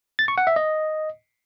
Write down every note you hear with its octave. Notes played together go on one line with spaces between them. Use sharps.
A6
C#6
F#5
E5
D#5